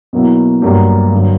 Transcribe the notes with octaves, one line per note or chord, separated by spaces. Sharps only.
B2 F#3 A#3 E4
G2 F#3 A#3 D4 G4
G2 D3 F#3 A#3